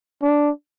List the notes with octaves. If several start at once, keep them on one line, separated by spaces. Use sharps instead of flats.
D4